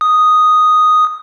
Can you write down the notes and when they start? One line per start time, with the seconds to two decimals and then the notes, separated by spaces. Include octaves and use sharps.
0.01 D#6